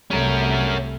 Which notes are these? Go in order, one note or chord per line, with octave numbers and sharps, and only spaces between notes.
C2 A3 C#4 A#4